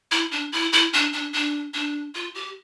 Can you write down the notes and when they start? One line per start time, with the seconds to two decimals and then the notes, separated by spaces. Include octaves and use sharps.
0.12 E4
0.31 D4
0.52 E4
0.73 E4
0.93 D4
1.13 D4
1.33 D4
1.74 D4
2.15 F4
2.35 G4